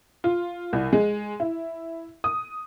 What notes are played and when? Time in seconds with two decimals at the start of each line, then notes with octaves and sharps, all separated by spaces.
0.24 F4
0.73 C2
0.93 G#3
1.40 E4
2.24 D#6